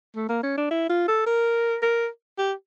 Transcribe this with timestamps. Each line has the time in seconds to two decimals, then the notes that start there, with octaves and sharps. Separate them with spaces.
0.16 A3
0.29 A#3
0.43 C#4
0.57 D4
0.71 E4
0.89 F4
1.08 A4
1.27 A#4
1.82 A#4
2.38 G4